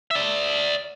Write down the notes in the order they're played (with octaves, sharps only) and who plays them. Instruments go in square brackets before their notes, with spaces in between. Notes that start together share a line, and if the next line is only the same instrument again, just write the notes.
[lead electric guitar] D5 E5